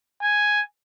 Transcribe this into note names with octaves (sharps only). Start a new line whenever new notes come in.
G#5